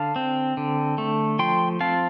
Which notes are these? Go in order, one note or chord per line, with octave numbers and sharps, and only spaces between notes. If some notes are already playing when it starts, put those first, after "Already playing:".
Already playing: D3 F5 A5
C4
D3
A3
F3 G5 C6
C4 F5 A5